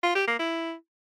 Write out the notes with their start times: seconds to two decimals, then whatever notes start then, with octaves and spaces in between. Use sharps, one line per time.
0.03 F4
0.15 G4
0.27 A#3
0.39 E4